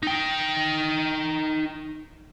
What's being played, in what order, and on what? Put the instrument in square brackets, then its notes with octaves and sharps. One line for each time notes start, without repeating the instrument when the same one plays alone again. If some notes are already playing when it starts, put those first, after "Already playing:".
[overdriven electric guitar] D#4 G5